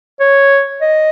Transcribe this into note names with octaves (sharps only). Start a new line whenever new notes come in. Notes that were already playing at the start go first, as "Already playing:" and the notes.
C#5
D#5